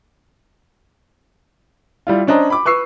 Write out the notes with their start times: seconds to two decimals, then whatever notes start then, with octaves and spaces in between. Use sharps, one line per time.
2.07 G3 E4 F4
2.27 C#4 D4 C5 D#5 A#5
2.50 B5 D6
2.66 B4 C#6 E6 C7